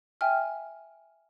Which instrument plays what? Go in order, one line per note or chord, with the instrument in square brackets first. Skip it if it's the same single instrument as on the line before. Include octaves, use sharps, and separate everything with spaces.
[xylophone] E5 G5 G#5 F6